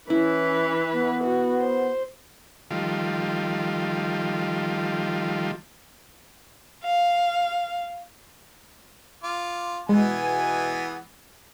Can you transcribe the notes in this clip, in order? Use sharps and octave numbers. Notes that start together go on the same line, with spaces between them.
E3 C#4 E4 B4
B3
F#4
C5
D#3 F3 G3 A3 F4
F5
F4 D6
B2 E3 G#3 B3 G#4 G#5